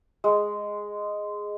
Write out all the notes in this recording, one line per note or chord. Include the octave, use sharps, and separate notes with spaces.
G#3